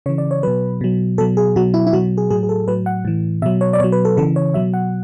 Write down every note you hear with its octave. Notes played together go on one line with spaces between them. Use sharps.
C#3 E3 C#5
D5
C#5
B2 F#3 B4
B2 F#3
B2 F#3 A4
G#4
B2 F#3 F#4
E4
E4
B2 F#3 F#4
G#4
A2 F#3 G#4
G#4
A4
A2 F#3 B4
F#5
A2 E3
B2 F#3 E5
C#5
D5
B2 F#3 C#5
B4
A4
C#3 E3 A4
C#5
B2 F#3 E5
F#5